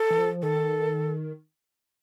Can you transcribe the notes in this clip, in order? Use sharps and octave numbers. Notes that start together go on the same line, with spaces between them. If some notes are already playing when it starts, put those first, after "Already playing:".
Already playing: A4
E3
F3
D#3 A4